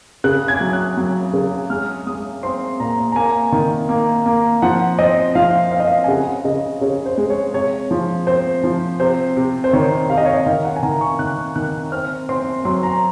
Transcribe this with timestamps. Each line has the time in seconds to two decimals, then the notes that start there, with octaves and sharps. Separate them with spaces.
0.24 C#3 F#6
0.48 G#6
0.61 F#3
0.73 F#6
0.97 F#3
1.33 C#3
1.70 G#3 F6
2.07 G#3 D#6
2.43 C4 C6
2.80 A#2 A#5
3.12 A#5
3.16 A#3 G#5
3.52 D#3
3.89 A#3
4.26 A#3
4.62 F3 F#5
4.99 C4 D#5
5.35 F3 F5
5.72 C4 F5
5.80 D#5
5.88 F5
6.04 G#5
6.08 C#3 F#5
6.45 C#3 D#5
6.81 C#3 C#5
7.06 C5
7.18 G#3
7.30 C#5
7.54 C3 C#5
7.91 F3
8.27 C4 C5
8.64 F3
9.00 C3 C5
9.37 C3
9.64 C5
9.73 D#3 C#5
10.10 C3 F5
10.17 D#5
10.25 C#5
10.33 D#5
10.46 D#3 F5
10.65 F#5
10.76 G#5
10.83 D#3 A#5
11.01 C#6
11.19 D#3 F#6
11.56 D#3 F#6
11.92 C4 F6
12.29 C4 C6
12.65 F#3 C6
12.83 A#5